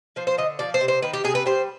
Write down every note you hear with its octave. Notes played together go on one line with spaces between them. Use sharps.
F3 C5
C5
D3 D#5
F3 D5
C5
C3
C5
D#3 B4
G4
C3 G#4
B4
G3 C5